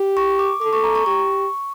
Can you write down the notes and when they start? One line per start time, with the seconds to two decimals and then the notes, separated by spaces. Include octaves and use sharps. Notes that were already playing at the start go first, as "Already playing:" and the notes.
Already playing: G4
0.17 C#6
0.39 D6
0.61 A4 D6
0.73 C#6
0.84 A#5
0.95 C#6
1.06 G4 C#6